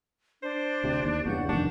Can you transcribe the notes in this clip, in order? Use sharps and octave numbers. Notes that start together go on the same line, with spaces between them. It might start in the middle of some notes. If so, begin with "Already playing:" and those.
D4 C5
D2 C3
D#2
E2 G2 C#3 F#4 F#5 G6
F1 D#2 D4